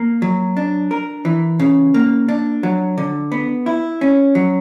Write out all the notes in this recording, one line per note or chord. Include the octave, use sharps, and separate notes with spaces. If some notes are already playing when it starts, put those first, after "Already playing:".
Already playing: A#3
F#3
D4
A#4
E3
C#3
A#3
D4
F#3
D3
B3
E4
C#4
F#3